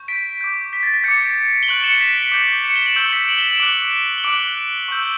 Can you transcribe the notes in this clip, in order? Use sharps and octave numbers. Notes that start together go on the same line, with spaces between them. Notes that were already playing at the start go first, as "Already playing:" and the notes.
Already playing: C#6 G6
B6 D7
D6 G6
B6
A6
B6
D6 G6 A6 C#7
B6 D7
G7
C#6 F#6 D7 F#7
C#7 E7
B6 D7
D6 G6
C#7 E7
E7 G7
D7 F#7
C#6 E6 G6 D7 F#7
B6 D7
D7 F#7
E7 G7
D7 F#7
D6 F#6 D7 F#7
G7
D6 F#6 D7 F#7
C#6 E6 G6